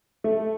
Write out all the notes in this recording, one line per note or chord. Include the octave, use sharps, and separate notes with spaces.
A3